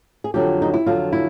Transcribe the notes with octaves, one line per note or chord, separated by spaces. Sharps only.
G#4
F2 D3 F#3 G4
D#4
E4
F2 D3 F#3 F4
E4